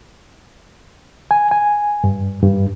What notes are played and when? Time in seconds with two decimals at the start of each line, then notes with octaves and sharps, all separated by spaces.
1.31 G#5
1.51 G#5
2.04 G2
2.43 G2